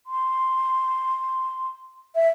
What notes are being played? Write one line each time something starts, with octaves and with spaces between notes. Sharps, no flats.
C6
E5